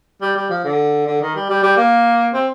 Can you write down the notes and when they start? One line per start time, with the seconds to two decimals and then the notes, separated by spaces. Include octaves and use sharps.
0.22 G3
0.36 G3
0.50 F3
0.64 D3
1.07 D3
1.21 D#3
1.35 G3
1.50 G3
1.63 G3
1.77 A#3
2.34 C4